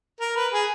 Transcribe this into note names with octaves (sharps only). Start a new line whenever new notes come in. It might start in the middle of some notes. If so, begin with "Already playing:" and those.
A#4
B4
G#4